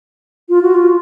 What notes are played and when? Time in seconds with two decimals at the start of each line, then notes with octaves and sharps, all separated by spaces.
0.49 F4
0.62 F#4
0.74 F4